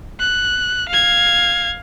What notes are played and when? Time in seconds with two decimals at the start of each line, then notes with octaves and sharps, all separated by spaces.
0.20 F#6
0.89 F5 G#6